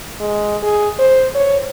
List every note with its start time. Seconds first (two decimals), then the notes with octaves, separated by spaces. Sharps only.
0.20 G#3
0.63 G#4
0.99 C5
1.35 C#5